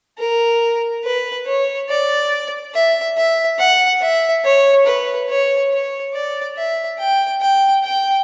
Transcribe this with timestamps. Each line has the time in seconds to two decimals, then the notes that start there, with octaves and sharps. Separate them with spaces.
0.18 A#4
1.04 B4
1.47 C#5
1.89 D5
2.74 E5
3.17 E5
3.59 F#5
4.01 E5
4.44 C#5
4.86 B4
5.29 C#5
5.71 C#5
6.14 D5
6.57 E5
6.99 G5
7.41 G5
7.84 G5